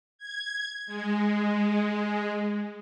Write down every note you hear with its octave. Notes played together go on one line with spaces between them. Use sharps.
G#6
G#3